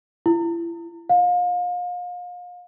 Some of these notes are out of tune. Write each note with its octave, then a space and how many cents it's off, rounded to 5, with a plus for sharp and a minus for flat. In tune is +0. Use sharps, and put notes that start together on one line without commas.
E4 +35
F5 +35